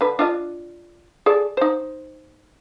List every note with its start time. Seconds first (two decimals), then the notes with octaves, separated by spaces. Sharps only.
0.01 D3 B4
0.19 D4 F4 D#5
1.26 G#4 A4 D5
1.57 D#4 C5